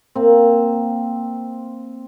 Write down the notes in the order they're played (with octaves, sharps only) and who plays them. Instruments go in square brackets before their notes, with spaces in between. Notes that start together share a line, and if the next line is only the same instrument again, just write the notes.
[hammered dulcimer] A#3 C4